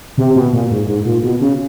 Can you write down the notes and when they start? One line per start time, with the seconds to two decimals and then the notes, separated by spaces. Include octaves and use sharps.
0.18 C3
0.35 B2
0.53 A#2
0.71 G#2
0.88 G#2
1.05 A#2
1.23 B2
1.41 C#3